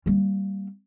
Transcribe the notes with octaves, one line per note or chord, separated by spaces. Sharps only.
G3 A#3